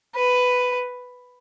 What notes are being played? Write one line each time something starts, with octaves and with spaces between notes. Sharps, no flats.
B4